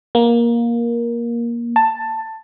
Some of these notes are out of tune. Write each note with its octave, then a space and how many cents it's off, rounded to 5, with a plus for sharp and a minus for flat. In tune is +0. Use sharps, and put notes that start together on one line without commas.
A#3 +15
A5 +10